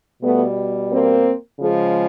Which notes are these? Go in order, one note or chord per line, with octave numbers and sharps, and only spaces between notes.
B2 G3 A3 B3
A#3 C4
C#3 F3 G#3